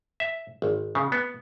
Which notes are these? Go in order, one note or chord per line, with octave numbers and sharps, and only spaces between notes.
E5
G#1
C#3
B3